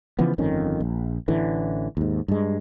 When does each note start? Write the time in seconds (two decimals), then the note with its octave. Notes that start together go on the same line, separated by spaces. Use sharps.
0.19 C#3 E3 F3 B3
0.38 G1 F2 D#3 C#4
0.80 A#1
1.28 A1 A2 D3 E3
1.97 D#2 G#2
2.28 G2 G#3